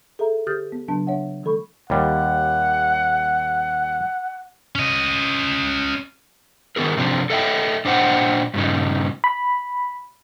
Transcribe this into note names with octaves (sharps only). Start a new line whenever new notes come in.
G#4 A4 E5 A#5
D3 G4 D#6 F6 G6 A6
B3
C#3 F#3 B3 D4 A5
D4 C#5 E5 F#5
D#3 E3 G#3 A4 B5 C#6
D#2 G3 F#5
C#4 D#5
D#3 B3 G#4 A#4
C3 F3 C4 D4
A4 D#5 E5 G5
A#2 D4 C5 D#5 F#5 G5
G2 A#2 C#3 D#4
B5